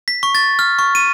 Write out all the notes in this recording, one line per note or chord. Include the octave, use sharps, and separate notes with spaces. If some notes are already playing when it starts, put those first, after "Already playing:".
B6
C#6
A6
F6
C#6
D#7